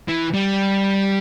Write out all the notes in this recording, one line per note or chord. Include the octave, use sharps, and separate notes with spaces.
E3
G3